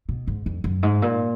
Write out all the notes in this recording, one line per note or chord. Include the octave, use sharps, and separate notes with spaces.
B2
G#2
F2
F#2
G#2
A#2